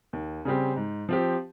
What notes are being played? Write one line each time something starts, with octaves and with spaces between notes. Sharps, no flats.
D#2
C#3 G3 C4 G4
G#2
F3 C4 G4